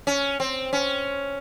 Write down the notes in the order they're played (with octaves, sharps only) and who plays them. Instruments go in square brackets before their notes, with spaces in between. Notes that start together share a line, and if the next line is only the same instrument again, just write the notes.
[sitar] C#4
C4
C#4